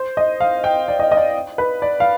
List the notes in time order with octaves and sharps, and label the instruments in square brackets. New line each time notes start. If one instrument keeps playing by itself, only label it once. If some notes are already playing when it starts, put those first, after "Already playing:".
Already playing: [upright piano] C5
D#5
F5
G5
D5
D#5
D#5
D5
B4
D5
F5